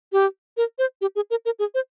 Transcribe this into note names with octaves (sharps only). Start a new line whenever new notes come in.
G4
A#4
C5
G4
G#4
A#4
A#4
G#4
C5